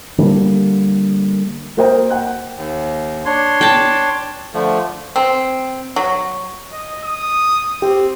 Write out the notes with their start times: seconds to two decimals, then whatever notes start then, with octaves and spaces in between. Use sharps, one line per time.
0.18 D3 G3 A#3
1.77 A#3 A#4 C5 D#5 G5
2.10 F#5 G5 F#6
2.56 D#2
3.25 D4 C#5 C6
3.61 G5 A5
4.54 D3 F3 A3
5.16 C4
5.96 F#3
6.72 D#5
7.04 D#6
7.82 C4 G4